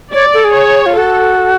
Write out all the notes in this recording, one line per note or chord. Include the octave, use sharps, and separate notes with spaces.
C#5 D5
A4
G#4
C#5
F4
F#4 A4